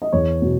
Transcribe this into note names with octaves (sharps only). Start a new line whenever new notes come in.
D#5
E2 C#5
B2